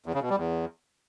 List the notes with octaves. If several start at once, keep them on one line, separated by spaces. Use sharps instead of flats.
E2
C#3
B2
G3
E2